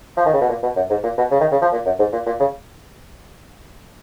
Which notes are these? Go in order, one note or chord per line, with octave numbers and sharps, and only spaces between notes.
F3
D#3
C#3
B2
A#2
B2
F#2
G#2
A#2
B2
C#3
D#3
C#3
F3
A#2
F#2
G#2
A#2
A#2
C#3